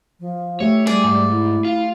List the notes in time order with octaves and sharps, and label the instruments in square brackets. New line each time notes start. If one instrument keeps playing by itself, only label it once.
[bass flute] F3
[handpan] A3 G4 E5 [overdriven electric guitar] C#5
[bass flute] G3 [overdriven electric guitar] G#4 [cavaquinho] D5
[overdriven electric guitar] G#2
[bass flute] E4
[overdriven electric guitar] F4